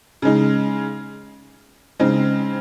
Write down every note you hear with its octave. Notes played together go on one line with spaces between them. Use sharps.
C#3 G#3 D#4
C#3 G#3 C4 D#4